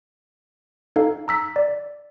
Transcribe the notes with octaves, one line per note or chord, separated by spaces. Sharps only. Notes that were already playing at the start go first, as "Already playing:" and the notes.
D#4 A4 F5
A#5 E6 B6
D5